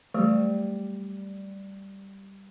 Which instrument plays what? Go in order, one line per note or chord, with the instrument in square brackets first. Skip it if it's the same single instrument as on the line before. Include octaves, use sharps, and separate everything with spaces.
[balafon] E3 F#3 A3 [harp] G3